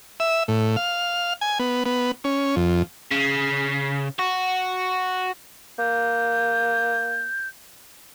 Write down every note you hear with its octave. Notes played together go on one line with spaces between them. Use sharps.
E5
A2
F5
G#5
B3
B3
C#4
F2
C#3
F#4
A#3 G6